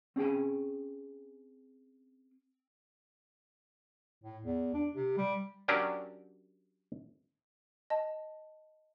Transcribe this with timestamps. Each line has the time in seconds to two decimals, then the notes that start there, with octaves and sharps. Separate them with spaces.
0.16 C4 C#4 G#4 G5 G#5
4.24 A2
4.45 E2
4.74 D4
4.95 C3
5.17 G3
5.68 F#3 C#4 D4 G4 A#4 D5
7.90 D#5 A5